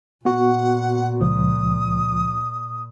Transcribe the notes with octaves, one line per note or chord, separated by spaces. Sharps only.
A#2 B3 F#4 F#5
C#2 F3 D#6